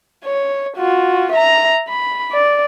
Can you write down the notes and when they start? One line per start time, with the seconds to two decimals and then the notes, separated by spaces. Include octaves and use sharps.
0.25 C#5
0.77 F4 F#4
1.32 E5 A#5
1.88 B5
2.31 D5